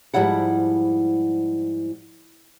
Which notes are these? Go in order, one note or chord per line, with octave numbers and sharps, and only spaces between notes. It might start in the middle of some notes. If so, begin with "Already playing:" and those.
G#2 F3 G3 E4 F#5